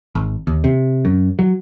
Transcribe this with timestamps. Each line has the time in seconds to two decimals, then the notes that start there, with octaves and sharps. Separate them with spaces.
0.15 G#1
0.47 D#2
0.64 C3
1.05 F#2
1.39 F#3